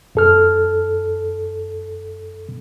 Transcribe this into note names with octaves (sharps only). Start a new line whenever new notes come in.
F#2 A4 F6